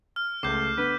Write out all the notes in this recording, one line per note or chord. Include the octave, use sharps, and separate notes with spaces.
F6
C#2 A3 C6 D6 G6
D3 B3 B4